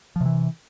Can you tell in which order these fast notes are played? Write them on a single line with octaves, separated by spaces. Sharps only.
F3 C3 E3